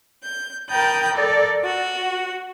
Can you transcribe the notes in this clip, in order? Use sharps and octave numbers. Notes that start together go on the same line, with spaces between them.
G6
A#4 G5 A5 B5 D#6 G6
A4 A#4 D5
F#4